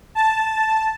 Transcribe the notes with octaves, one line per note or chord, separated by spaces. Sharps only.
A5